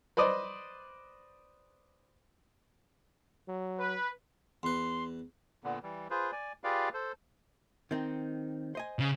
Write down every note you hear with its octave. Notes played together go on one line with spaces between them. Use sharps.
B4 C5 D5 D#5
F#3
B4
E2 B4 C6
A#2 D3 B3
E3 G3
F4 G#4 B4 C5
D5 G#5
F4 G4 G#4 B4 D5 F5
A4 C5
D#3 C4 D#4
C5 D#5 G#5
C#3